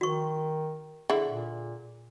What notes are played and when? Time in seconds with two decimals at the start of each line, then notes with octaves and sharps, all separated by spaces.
0.01 D#3 F#4 C#6
1.10 D3 E4 G#4
1.25 A#2